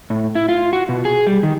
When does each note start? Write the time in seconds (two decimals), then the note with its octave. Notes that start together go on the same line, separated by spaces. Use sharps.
0.10 A2
0.35 E4
0.49 F4
0.73 F#4
0.89 B2
1.05 G#4
1.27 G3
1.43 D#3